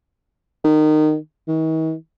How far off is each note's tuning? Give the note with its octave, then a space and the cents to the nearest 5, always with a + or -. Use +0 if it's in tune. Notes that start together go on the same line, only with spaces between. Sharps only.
D#3 -20
D#3 +45